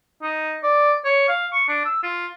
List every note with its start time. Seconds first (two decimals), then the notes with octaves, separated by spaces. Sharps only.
0.23 D#4
0.64 D5
1.05 C#5
1.29 F5
1.53 C#6
1.68 D4
1.85 E6
2.03 F4